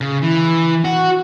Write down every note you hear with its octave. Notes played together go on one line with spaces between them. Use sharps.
C#3
E3
F#4